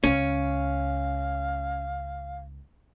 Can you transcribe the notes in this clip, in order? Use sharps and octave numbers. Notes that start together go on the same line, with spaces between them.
C#2 C#4 F5